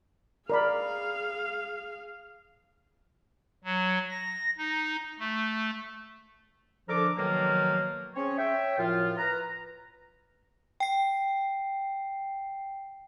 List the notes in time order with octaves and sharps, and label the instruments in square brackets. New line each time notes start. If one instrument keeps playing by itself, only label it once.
[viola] G#4 F5 [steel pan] A#4 D5 B5
[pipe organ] F#3
A#6
D#4
A3
[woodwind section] D3 F3 D4 A4 A#4 D6
B2 D#3 F3 F#3 A3 A#3
C4 C#4 G#4 C#5
C#5 E5 G5
F#2 A2 F3 F4
B4 A#5
[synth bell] G5 C7